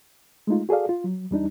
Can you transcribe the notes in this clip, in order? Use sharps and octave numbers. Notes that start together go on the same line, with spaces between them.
G#3 A3 D#4 F4
F#4 G#4 A4 D5 F5
F4
F#3
E2 G3 D4 D#4